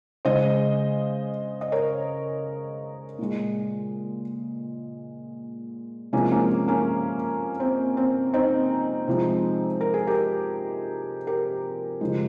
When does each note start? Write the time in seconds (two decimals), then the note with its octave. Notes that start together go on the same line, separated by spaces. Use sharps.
0.25 C#3 G#3 C5 D#5
1.61 D#5
1.72 A#4 C#5
3.19 A#2 G#3
6.13 C3 F3 G#3 A#3 C#4
6.31 A#3 C#4
6.68 A#3 C#4
7.60 C4
7.97 C4
8.34 C4 D#4
9.08 C3 F3 G#3
9.81 A#4
9.94 G#4
10.07 G4 A#4
11.27 G4 A#4
12.01 C#3 F3 G#3